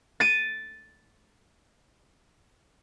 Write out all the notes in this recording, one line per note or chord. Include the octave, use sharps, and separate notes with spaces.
A6 D7 D#7